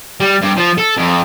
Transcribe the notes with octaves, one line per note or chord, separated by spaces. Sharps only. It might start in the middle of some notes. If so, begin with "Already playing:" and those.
G3
G2
F3
A4
F2